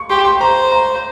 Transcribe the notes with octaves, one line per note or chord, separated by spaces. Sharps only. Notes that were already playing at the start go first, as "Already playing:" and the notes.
Already playing: C#6
G4 C6
C6
C5 A#5
A#5